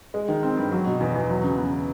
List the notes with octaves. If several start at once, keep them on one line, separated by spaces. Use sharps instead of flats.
G#3
D#3
C4
G2
F#3
B2
E2
E2
F#3
C#3
B3